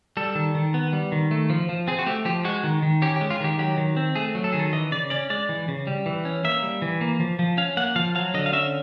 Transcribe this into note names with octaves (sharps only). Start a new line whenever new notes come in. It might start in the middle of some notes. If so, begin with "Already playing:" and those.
G3 A4
D#3
D#3
B3
G3
D#3
A3
F3
F3
C4 G#4
F#4
A3 G4
F3 G4
G#3 F#4
D#3
D#3
C#4 G4
G4
G#3
F4
D#3 G4
F#3 G4
D#3
C4
A3 G#4
F#3
A4
D#3 G#4
A4
E3 D#5
C#3 D5
C#4 D5
G#3 D5
E3
C#3
G3
E3
C#4
A#3 E5
G3
E3
A#3
F3
F3
C#4 F5
A#3 F#5
F3 F5
F#3 F5
D3 D#5
F5
C#4 E5